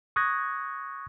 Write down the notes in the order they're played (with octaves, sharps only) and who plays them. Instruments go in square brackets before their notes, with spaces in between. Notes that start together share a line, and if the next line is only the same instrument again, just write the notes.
[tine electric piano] C#6 D#6 F#6 G#6 A#6